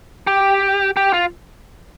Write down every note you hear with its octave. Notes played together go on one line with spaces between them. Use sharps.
G4
G4
F4